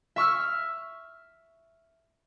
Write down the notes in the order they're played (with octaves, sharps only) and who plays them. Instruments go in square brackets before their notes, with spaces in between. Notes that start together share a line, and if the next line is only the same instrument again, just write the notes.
[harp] E5 C#6 E6 F6